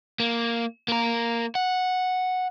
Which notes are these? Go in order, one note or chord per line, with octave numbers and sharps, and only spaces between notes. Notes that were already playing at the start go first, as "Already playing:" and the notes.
A#3
A#3 A#4
F#5